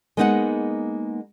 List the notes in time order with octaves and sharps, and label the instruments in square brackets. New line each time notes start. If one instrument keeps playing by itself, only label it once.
[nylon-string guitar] G#3 A#3 B3 D#4 D#5 F#5